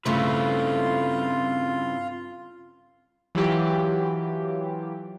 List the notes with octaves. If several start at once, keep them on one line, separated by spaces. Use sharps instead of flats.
G2 C#3 A3 C4 E4 F4 B4
E3 F#3 F4 G4